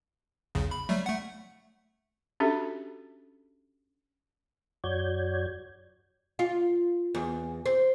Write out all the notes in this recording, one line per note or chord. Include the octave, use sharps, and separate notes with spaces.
B1 E2 C#3
B5
F#3 G3 A3
A3 F#5
C#4 D4 F#4 G4 A4 E5
F#2 F#4 C#5 D5 G6 G#6
F4
E2
C4